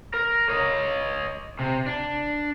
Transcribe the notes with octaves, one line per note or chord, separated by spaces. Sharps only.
A#4
C#5 D#5
C3
D4